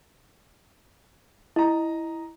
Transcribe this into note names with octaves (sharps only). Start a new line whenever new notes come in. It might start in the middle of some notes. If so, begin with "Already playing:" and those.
E4 D#5 A#5